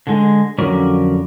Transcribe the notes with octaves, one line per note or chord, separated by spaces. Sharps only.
D3 G#3
F2 D3 F#3 C#4 A#4 D5